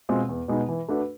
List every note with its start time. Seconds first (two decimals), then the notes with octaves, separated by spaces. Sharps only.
0.09 B2 G#3 C4 F4
0.29 E2
0.48 B2 G#3 B3 D#4
0.69 E3
0.89 A3 D4 F#4 B4